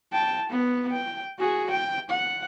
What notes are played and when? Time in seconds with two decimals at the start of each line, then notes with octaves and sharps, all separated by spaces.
0.12 G5 A5
0.50 B3
0.92 G5
1.39 F#4 G#4
1.71 G5
2.11 F#5